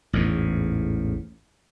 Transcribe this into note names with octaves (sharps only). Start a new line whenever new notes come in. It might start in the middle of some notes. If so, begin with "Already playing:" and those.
A1 E2 G#2